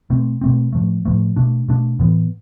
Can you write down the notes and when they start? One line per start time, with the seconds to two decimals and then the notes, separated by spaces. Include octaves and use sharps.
0.10 B2 A3 C4
0.41 B2 A3 C4
0.73 A2 F3 A3
1.05 A2 F3 A3
1.36 B2 A3 D4
1.69 B2 A3 D4
1.99 A2 E3 B3